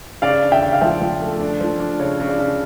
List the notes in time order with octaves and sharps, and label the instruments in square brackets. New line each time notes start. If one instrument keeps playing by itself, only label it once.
[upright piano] C#3 [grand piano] D5 F5
[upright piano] D4
[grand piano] E5 G5
[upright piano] C#3
[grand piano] F5
[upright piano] F3 [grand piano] E5 G5
[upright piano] F3
A3
D4
F3
D4
[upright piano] C#3 [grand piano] C#5
[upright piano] C#3
[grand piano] D5
[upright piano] C#3